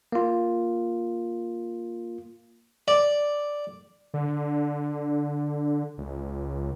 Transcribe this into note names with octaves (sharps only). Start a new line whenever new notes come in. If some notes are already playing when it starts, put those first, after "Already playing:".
A#3 F4
D5
D3
C#2